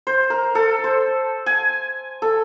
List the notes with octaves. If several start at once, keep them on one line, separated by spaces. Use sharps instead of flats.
C5
A#4
A4
C5
G#5
A4